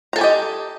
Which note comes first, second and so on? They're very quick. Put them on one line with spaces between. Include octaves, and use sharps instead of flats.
A#5 A4 G#5 G4 D#5